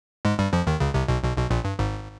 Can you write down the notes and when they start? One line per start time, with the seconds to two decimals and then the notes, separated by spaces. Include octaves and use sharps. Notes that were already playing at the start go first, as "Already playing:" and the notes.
0.25 G#2 G#3
0.39 G2 G3
0.53 F2 F3
0.67 D#2 D#3
0.80 C#2 C#3
0.94 C2 C3
1.08 B1 B2
1.23 B1 B2
1.37 B1 B2
1.51 A#1 A#2
1.65 G2
1.79 G#1 G#2